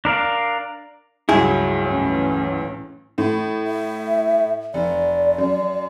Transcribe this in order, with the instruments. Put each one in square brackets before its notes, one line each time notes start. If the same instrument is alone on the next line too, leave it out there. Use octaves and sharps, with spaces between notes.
[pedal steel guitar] D4 A#4 D5 F5
[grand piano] C#2 G2 F#3 [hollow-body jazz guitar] E4 G#4
[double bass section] A2 E3 C#4
[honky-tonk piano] A2
[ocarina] E5
[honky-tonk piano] F1 [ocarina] D5
[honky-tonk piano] F#2